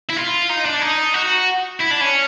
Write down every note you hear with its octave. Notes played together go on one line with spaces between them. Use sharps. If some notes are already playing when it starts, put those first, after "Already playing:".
E4
F4
D#4
D4
D#4
F#4
E4
D4
C#4